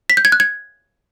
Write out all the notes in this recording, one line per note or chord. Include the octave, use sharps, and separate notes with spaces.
B6
G6
G#6
F#6
G#6